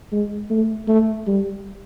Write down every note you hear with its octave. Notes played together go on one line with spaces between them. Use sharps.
G#3
A3
A3
G3